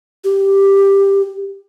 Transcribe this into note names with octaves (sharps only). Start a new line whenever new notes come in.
G4